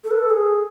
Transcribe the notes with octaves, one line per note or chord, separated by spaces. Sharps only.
A4
B4
A4
G#4